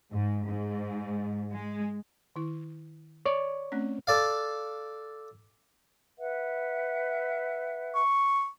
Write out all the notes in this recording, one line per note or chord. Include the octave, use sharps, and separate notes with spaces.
G#2
G#2
G#3
D#3 E4
C#5 D5
A3 C4 C#4
A4 D5 F5
B4 E5 F#5
C#6